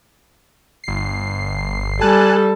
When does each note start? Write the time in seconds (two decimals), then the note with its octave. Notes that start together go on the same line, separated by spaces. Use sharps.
0.84 G1 C7
2.01 G3 A4 G#5 A5 F#6